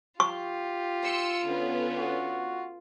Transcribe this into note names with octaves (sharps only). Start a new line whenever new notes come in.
F4 G4 C#6
C6 E6 C#7
D3 B3 C#4
F#4